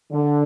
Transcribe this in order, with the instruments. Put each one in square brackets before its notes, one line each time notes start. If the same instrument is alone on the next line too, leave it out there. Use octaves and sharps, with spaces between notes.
[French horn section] D3